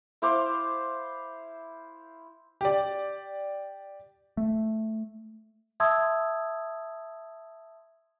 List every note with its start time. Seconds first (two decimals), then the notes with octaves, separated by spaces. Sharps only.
0.22 E4 C5 F5 D6
2.61 G4 D5
4.37 A3
5.80 E5 A5 C6 D#6 E6 G#6